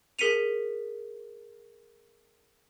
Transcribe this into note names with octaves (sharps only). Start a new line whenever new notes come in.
G#4 A#4 B6 C#7 D#7 F7